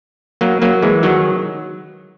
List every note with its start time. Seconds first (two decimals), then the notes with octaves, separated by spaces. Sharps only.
0.41 F#3 A#3
0.62 F#3 A#3
0.82 E3 G#3
1.03 D#3 F#3